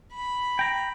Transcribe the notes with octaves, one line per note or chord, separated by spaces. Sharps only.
B5
G5 A#5